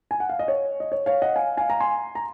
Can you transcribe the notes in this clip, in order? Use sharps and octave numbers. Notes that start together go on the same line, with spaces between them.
G#5
F#5
F5
D#5
C#5
D#5
C#5
C#5 F5
D#5 F#5
F5 G#5
F5 G#5
A#5
G#5 C6
A#5